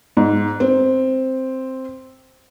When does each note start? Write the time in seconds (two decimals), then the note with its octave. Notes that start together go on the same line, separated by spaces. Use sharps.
0.17 G#2
0.60 C4